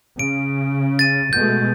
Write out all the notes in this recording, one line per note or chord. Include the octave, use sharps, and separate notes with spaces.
C#3 D7
A6 D#7
B2 G#3 A3 G6